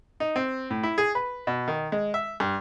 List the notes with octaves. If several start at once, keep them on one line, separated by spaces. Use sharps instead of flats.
D#4
C4
A2
E4
G#4
B4
B2
D#3
G#3
E5
G2